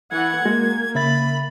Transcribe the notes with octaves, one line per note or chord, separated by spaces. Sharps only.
E3 F#5 G#6
G#3 A#3 F#4
C#3 E5 B5 A6